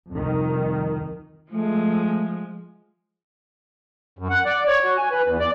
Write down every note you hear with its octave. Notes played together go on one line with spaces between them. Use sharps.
C2 F2 D#3
F3 G#3 A3
F#2
F#5
D5
C#5
F#4
G#5
B4
E2
D5